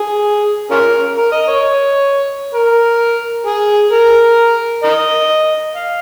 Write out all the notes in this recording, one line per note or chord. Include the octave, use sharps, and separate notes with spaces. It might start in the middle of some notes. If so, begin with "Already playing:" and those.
Already playing: G#4
C#4 F4 A#4
A#4
D#5
C#5
A#4
G#4
A#4
A#4 D#5
F5